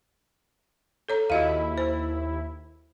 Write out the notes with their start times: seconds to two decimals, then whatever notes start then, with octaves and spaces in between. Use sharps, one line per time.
1.09 A4 C#5 A#5
1.30 D#2 E4 F#4 D#5 F5
1.78 C5